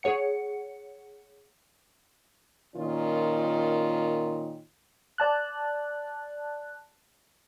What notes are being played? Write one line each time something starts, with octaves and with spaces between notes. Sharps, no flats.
G#4 C#5 F#5 C#7
A#2 D#3 C#4 F4
D5 A5 F#6